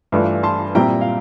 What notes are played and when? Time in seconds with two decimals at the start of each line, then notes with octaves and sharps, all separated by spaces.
0.12 G2 E3 A3 D4 F4
0.43 A5 C6
0.75 A#2 G3 C4 E4 G5 A#5
1.01 F5